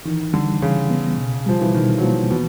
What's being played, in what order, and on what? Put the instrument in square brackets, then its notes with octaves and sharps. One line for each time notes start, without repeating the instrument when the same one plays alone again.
[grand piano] D#3 [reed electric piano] E3
[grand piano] D3 [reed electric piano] G3
[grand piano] C#3 [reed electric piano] E3
[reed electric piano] B3
B2
[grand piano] F3 [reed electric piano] G3
[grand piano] E3
[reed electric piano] B2 [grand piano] D#3
[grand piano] F#3
[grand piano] F3 [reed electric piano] A#3
[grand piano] B2 [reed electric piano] E3